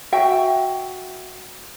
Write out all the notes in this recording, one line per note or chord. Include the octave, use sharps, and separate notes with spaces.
F#4 E5 G5